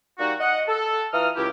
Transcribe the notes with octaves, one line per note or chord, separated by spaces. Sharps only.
G3 A#3 D#4 F#4
D#5 F#5
A4
E3 F4 A#5 D#6 F6
C#2 E4 G4